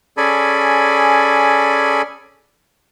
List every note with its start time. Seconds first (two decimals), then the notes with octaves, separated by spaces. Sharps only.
0.17 C#4 G#4 A4 D5 G#5 B5